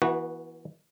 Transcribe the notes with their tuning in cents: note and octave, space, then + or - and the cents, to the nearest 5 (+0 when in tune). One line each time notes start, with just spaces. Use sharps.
E3 +0 B3 -40 F#4 +0